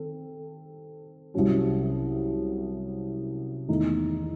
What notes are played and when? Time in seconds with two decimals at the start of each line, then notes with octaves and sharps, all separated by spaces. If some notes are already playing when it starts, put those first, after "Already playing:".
Already playing: D#3 C4 A4
1.34 C2 C3 F#3 C#4 F#4
3.68 E2 D#3 A3 D#4